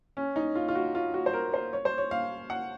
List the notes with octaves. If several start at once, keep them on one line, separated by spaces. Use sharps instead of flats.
C#4
D#4
F4
F4
F#4
F4
F#4
C5
A#4
C5
C#5
C5
C#5
F5
F#5